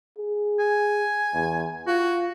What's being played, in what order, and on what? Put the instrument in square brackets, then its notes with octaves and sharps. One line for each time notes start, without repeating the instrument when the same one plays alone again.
[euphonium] G#4
[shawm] G#5
[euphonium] E2
[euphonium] F4 [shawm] F#4